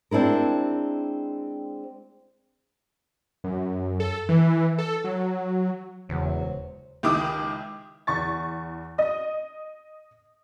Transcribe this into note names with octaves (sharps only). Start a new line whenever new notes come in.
G#3 C4 D4 E4 A#4
F#2
A4
E3
A4
F#3
D#1 E2 C#3 F#3 G#3 C5
C#2 D#3 E4 G4 D6 D#6
E2 C#6 A6
D#5 D#6